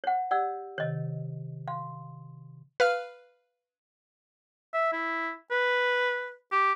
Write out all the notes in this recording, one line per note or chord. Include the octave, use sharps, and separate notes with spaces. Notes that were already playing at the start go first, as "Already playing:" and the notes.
C#5 F#5
G4 D5 F#5 E6
C3 D#3 C#5 D#5
F5 C6
B4 F5 F6
E5
E4
B4
G4